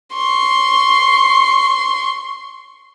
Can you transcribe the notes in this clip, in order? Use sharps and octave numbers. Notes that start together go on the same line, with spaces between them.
C6 C#6